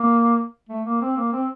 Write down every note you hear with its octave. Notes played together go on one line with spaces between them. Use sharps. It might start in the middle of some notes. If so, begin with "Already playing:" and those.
Already playing: A#3
A3
A#3
C4
A#3
C4